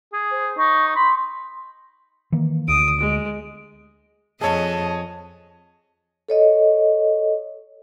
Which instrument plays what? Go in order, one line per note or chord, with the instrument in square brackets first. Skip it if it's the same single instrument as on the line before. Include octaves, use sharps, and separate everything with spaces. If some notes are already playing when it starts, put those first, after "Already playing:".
[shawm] G#4
[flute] C5
[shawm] D#4 [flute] C#6
[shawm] B5 [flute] C6
[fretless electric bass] D#3 E3 A#3
[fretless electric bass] D2 [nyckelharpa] D#6 [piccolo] D7
[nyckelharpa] G#3
[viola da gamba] F2 D#5 [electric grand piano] G#4 C#5 [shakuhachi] A5
[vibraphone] A4 C#5 D#5